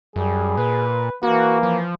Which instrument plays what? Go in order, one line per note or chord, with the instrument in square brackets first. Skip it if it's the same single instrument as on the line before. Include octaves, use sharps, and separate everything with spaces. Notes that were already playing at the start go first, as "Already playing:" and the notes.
[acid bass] F#2 [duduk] G3 [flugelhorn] G#4
[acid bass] A#2 [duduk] B4
[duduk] E3 [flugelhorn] A#3 [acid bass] F#4
[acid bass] F3